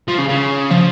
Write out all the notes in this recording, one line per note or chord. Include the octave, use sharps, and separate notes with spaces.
F3
C#3
C#3
F3